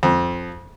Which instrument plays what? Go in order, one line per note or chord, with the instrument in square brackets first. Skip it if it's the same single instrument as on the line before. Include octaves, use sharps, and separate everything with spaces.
[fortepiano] F2